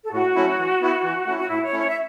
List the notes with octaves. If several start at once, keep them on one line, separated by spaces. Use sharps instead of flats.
A4
A2 F#4
F#3 A3 C#4 E4
E3
B3 E4
E3
A3 C#4 E4
F#4
A2 E4
C#5
A3 C#4 E4
C#5
E5